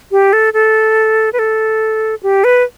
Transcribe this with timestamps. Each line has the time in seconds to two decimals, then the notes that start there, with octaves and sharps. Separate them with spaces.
0.12 G4
0.33 A4
0.53 A4
1.33 B4
1.39 A4
2.23 G4
2.44 B4